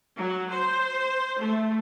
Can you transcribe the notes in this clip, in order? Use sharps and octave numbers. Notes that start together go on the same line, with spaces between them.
F#3
C5
A3